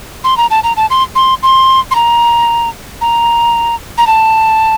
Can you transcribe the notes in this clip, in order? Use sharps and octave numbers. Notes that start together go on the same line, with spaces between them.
C6
A#5
A5
A#5
A5
C6
C6
C6
C6
A#5
A#5
A#5
A5